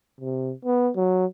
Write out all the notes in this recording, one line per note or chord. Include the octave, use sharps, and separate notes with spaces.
C3
B3
F#3